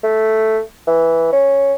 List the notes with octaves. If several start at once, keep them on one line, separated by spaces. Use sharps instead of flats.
A3
E3
C#4